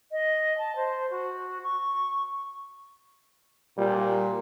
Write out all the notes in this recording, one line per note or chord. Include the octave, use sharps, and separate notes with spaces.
D#5
A5
C5
F#4
C#6
A#2 G3